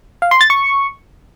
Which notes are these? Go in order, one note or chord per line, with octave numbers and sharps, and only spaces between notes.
F5
C6
A6
C#6